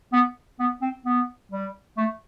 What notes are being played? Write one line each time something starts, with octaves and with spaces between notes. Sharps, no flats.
B3
B3
C4
B3
G3
A3